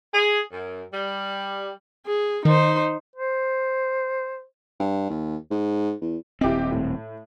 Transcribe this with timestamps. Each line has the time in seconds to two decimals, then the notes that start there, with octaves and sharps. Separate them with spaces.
0.12 G#4
0.52 F#2
0.92 G3
2.06 G#4
2.45 D#3 D#4 C5
3.16 C5
4.80 G2
5.10 D#2
5.51 G#2
6.01 E2
6.41 D#1 C4 E4 G4 D#5
6.71 A2